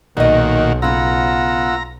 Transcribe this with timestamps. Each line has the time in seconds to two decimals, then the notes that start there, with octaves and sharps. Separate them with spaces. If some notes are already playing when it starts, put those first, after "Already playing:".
0.17 B1 A#2 D#3 F#4 D5 D#5
0.82 C#3 B3 F4 F#5 A#5 E6